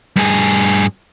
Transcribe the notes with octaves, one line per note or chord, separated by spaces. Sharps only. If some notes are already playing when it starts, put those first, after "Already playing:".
G2 G#4